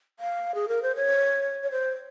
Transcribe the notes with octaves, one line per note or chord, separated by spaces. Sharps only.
F5
G#4
A#4
C5
C#5
C#5
C5